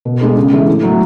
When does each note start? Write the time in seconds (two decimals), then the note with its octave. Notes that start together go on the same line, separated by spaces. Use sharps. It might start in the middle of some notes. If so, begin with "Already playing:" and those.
0.05 B2
0.21 G#3 D4 A4
0.37 C#3
0.52 E3 G#3 D4 A4
0.67 A2
0.83 F#3 A3